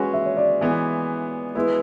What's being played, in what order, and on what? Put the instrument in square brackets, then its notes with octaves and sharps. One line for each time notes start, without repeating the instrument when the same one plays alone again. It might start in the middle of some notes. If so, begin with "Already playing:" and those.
Already playing: [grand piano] G#3 C#4 F#4 B4 [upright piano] G#5
[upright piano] E5
C#5
D5
[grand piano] E3 G#3 B3
[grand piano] G#3 B3 E4 [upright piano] B4